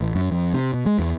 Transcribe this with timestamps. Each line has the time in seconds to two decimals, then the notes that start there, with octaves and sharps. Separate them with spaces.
0.01 A1
0.15 F#2
0.31 F2
0.54 C3
0.74 B2
0.86 G#3
0.99 E2